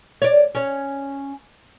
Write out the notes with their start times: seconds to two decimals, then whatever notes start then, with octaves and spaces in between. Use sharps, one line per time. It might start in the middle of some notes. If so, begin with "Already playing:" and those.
0.22 C#5 D5
0.55 C#4 C#5